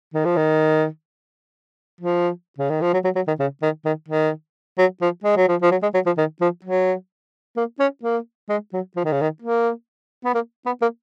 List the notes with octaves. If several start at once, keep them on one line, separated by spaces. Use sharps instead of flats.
D#3
F3
D#3
F3
C#3
D#3
F3
F#3
F#3
F#3
D#3
C#3
D#3
D#3
D#3
F#3
F3
G#3
F#3
F3
F3
F#3
G#3
F#3
F3
D#3
F3
F#3
A#3
C#4
A#3
G#3
F#3
F3
D#3
C#3
D#3
A#3
B3
A#3
B3
A#3